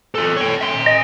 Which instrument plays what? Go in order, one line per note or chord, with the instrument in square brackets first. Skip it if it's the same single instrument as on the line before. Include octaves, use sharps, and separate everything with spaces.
[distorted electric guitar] F4 A4
C#5 G5
E5 C6
[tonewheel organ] D#5